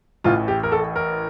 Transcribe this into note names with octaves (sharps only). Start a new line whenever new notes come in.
A1 A2 E3 F4
G4
A#4
A4
A#4